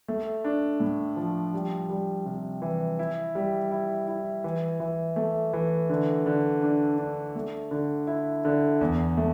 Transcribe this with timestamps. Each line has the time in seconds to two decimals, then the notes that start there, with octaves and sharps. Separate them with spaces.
0.08 A3
0.44 D4
0.80 A2
1.16 F3
1.54 G3
1.89 G3
2.26 C3
2.62 E3
2.99 E4
3.35 G3
3.71 E4
4.08 E4
4.44 E3
4.80 E3
5.16 A3
5.53 E3
5.90 D3
6.26 D3
6.63 D4
6.98 D4
7.35 A3
7.71 D3
8.07 E4
8.45 D3
8.81 E2
9.17 A3